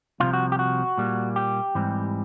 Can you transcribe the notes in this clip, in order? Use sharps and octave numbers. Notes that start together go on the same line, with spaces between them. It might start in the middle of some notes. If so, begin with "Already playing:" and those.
C2 C3 F3 F4
F#4
G4
F#4
A#2 G3 A#3
G4
G#2 E3 G3 C4